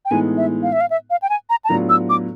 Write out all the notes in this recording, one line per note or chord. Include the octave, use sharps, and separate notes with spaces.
G5
A2 E3 G#3 B3 D#4 G#5
E5
F5
E5
F5
E5
F5
G5
G#5
A#5
A5
A2 F#3 B3 D4 F4 A#5
E6
D6